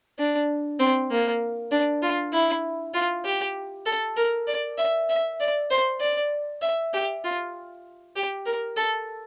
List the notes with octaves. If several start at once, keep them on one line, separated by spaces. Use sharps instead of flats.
D4
C4
A#3
D4
F4
E4
F4
G4
A4
A#4
D5
E5
E5
D5
C5
D5
E5
G4
F4
G4
A#4
A4